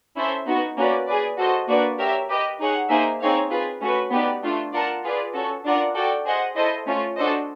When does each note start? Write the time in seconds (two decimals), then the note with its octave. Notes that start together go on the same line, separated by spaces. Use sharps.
0.16 C#4 E4 A4 C5 E5
0.46 B3 D#4 F#4
0.76 A#3 C#4 F#4 B4 D5
1.08 G#4 B4 D5
1.37 F#4 A4 C5 D#5
1.68 A#3 D4 F#4 B4 D5
1.98 G4 A#4 C#5 E5
2.28 G4 B4 D#5 G5
2.59 D#4 G#4 C#5 F#5
2.89 A#3 D#4 G#4 C5 E5
3.20 C4 D#4 G#4 C#5 F5
3.50 F4 G#4 B4
3.81 A3 C#4 F#4 B4
4.11 B3 D#4 G4 B4 D5
4.42 A3 D4 F4
4.73 F4 A#4 D5 F#5 A5
5.04 F4 G#4 B4 D5
5.33 C#4 F#4 A4
5.64 D4 F4 A#4 D5 F#5
5.94 F#4 A4 D5 G5
6.25 G#4 C5 D#5 F#5
6.55 E4 A4 C5 D#5
6.86 A3 C#4 F4
7.16 D4 F#4 A4 C5 D#5